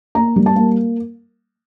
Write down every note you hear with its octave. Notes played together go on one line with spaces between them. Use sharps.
A#3 A#5
G3
A5
A#3